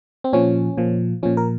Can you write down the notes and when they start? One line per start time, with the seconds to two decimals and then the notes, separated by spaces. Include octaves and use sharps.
0.24 C4
0.33 A#2 F3 C#4
0.77 A#2 F3
1.23 A#2 F3 C#4
1.37 A#4